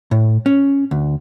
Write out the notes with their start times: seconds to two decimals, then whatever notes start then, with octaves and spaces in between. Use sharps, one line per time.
0.11 A2
0.46 C#4
0.91 D2